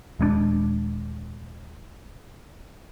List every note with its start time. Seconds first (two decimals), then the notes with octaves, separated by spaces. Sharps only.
0.19 D#1 G#3 A#3 D4